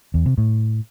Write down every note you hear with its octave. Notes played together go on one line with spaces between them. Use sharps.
E2
C3
A2